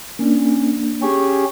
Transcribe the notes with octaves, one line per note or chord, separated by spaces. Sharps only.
A#3 C#4 D4
C#4 G4 G#4 C#6